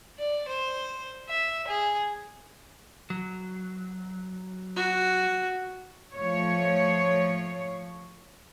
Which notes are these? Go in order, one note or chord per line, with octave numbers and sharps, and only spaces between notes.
D5
C5
E5
G#4
F#3
F#4
F3 A3 C#5